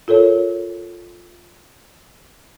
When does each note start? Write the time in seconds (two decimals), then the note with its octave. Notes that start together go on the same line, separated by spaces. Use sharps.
0.08 F4 A4 A#4 C#5